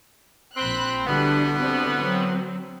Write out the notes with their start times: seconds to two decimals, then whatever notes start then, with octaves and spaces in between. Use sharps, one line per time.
0.56 A#1 C4 B5 F#6
1.06 B2 D3 E3 G3 B3 D4
1.59 D3 C4 D4
1.97 F#3 C4